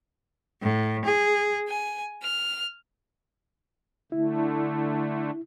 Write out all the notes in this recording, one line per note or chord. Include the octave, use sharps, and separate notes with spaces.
A2
G#4
G#5
F6
D3 A3 E4